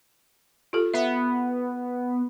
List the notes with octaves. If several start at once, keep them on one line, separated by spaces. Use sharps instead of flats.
F4 G4 A4
B3 E5